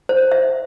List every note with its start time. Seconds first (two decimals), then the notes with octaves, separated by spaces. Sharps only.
0.09 C5
0.32 E5